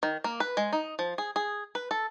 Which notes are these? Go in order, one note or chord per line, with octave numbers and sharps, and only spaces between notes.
D#3
A#3
B4
G#3
D#4
F3
G#4
G#4
B4
A4